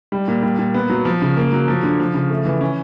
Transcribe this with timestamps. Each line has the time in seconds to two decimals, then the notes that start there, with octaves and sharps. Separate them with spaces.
0.12 G3
0.28 A#2
0.43 G3
0.58 A#2
0.74 B3
0.90 F#3
1.05 F3
1.22 C#3
1.37 A#3
1.53 F#3
1.68 F3
1.83 D3
2.00 F3
2.14 C#3
2.30 A3
2.45 E3
2.61 C#4